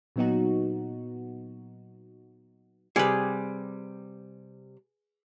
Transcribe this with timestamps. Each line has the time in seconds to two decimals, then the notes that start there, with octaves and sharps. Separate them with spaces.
0.16 A#2 F#3 B3 D#4 F#4
2.96 C3 G3 G#4 B4